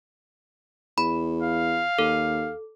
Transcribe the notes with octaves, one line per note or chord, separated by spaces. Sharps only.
E2 B5
F5
D#2 A4